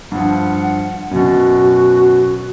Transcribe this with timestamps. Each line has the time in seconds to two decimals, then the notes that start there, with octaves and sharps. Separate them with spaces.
0.12 G2 F3 F#5
1.11 F#2 B2 F#4